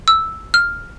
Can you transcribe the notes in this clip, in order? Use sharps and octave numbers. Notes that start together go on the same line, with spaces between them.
E6
F6